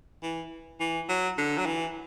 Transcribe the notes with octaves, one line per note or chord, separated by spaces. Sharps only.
E3
E3
F#3
D3
F#3
E3